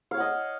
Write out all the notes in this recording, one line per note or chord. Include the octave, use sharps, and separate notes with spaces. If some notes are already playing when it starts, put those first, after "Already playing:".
C#5 D#5 F5 F#5